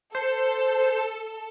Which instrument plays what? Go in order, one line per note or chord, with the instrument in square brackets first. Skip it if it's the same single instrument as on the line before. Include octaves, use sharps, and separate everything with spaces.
[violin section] A4 [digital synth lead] C5